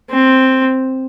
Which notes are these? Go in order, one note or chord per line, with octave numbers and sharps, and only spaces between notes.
C4